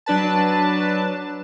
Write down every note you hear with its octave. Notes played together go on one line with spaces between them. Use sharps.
F#3 D4 B4 A5